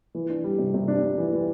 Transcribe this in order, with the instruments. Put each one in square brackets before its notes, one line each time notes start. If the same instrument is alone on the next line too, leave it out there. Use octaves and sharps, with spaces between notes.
[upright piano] E3
D4
G3
C3
C3
D4
D4
E3
E3